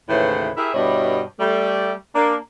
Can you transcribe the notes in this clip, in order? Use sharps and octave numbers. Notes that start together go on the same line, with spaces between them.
D#2 A2 C#3 E3 B4 C5
E4 G4 G#4 A#4 E5
G2 B2 G3 E4 C#5 D#5
G3 A3
A#3 D4